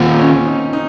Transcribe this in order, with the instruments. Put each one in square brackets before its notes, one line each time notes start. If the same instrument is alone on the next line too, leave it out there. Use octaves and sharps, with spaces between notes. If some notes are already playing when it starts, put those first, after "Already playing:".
Already playing: [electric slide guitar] D#3 A#3 F4 [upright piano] C4
[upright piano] C#4
D#4
D#4